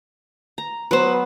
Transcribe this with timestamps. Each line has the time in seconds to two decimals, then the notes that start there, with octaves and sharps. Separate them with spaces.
0.58 A#5
0.91 F#3 B3 B4 C5